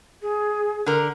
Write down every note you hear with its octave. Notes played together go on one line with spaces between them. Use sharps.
G#4
D3 A#4